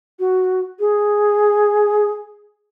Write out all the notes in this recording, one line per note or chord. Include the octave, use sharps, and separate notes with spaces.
F#4
G#4